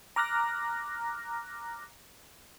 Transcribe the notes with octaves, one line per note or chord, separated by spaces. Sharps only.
A#5 D6 F6 F#6 A#6